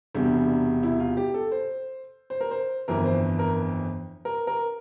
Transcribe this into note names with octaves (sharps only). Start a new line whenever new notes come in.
E1 E2 C3 G3 D4
E4
F4
G4
A4
C5
C5
A#4
C5
G1 F2 E3 A#4
C5
A#4
A#4
A#4